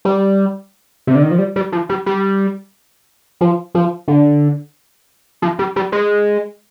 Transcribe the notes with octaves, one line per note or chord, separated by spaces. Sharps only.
G3
C3
D3
D#3
F3
G3
G3
F3
G3
G3
F3
F3
D3
F3
G3
G3
G#3